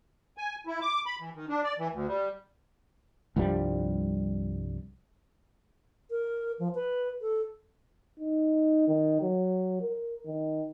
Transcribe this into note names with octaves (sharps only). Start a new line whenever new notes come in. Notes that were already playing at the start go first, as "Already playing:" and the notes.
G#5
E4
D6
B5
E3
D#3
D4
D5
E3
D2
G3
C2 G2 F3 G3
A#4
F3
B4
A4
D#4
D#3
F#3
A#4
D#3